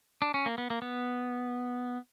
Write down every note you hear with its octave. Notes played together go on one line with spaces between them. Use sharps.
D4
C#4
A#3
B3
A#3
B3